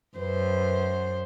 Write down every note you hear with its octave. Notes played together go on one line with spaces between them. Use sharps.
F#2 B4 C5